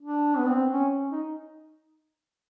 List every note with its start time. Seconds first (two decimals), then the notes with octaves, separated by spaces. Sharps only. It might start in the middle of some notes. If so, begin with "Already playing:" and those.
0.01 D4
0.37 B3
0.48 C4
0.71 C#4
1.11 D#4